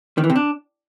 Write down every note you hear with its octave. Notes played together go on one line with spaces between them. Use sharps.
D#3
E3
C3
D4